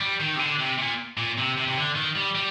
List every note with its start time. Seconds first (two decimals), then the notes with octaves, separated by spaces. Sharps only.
0.01 G3
0.20 D#3
0.35 C3
0.39 D3
0.60 C3
0.79 A#2
1.17 A#2
1.38 C3
1.57 C3
1.68 C3
1.76 D3
1.96 D#3
2.16 G3
2.35 G3